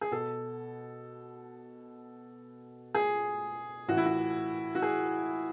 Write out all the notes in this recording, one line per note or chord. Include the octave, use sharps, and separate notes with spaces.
G#4
B2 A4
G#4
A2 E3 F#4
E4
F#4
F#4
G#4